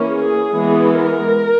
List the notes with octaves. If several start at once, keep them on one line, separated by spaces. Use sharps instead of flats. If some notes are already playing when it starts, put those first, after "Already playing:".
Already playing: E3 A#3 C#4
G#4
E3 G#3 B3
A#4